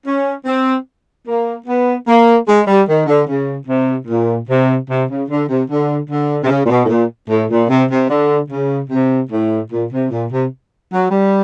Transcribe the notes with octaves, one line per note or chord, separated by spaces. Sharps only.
C#4
C4
A#3
B3
A#3
G#3
G3
D#3
D3
C#3
C3
A#2
C3
C3
C#3
D3
C3
D3
D3
C3
C#3
A#2
B2
A2
A#2
A2
A#2
C3
C3
D3
C#3
C3
A2
A#2
C3
A#2
C3
F#3
G3